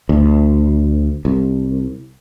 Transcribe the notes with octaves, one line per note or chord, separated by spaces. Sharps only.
D2
C2